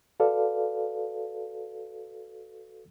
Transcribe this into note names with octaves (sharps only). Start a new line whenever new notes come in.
F#4 A4 B4 D5 F5